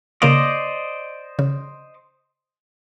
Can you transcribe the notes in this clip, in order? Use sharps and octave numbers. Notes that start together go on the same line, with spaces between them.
C#3 A#3 C5 D5 D#5 F5
C#3